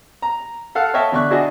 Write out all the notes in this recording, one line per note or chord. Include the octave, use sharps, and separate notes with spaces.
A#5
A4 F5 F#5 F6
C#5 D#5 E5 G5 A5
B2 D3 D5 E5 C#6 F#6
D4 E4 F#4 G#4 D5 D#5